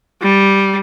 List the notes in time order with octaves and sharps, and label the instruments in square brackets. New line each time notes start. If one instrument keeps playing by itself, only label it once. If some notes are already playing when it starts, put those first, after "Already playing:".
[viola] G3